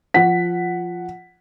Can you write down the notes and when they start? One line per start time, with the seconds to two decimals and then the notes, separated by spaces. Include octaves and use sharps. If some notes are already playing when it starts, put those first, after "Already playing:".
0.14 F3 F#5 B6